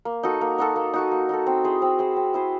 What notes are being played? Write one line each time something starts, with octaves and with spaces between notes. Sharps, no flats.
A#3
D#4 F#4 A4
A#3
D#4 F#4 A4
A#3
D#4 F#4 A4
A#3
D#4 F#4 A4
C4
E4 G#4 C5
C4
E4 G#4 C5
C4
E4 G#4 C5